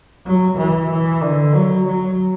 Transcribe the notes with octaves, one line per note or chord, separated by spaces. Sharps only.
F#3
E3
E3
D3
F#3
F#3